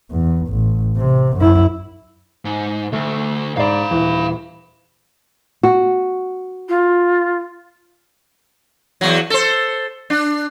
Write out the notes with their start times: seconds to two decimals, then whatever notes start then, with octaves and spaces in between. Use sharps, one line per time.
0.11 E2
0.48 A1
0.97 C3
1.37 F#2 E4
2.45 G#2
2.93 D2 A3
3.57 G#2 D5 F5 B5
3.91 D#1 E3
5.63 F#4
6.69 F4
9.01 E2 F#3
9.30 A4 C5
10.10 D4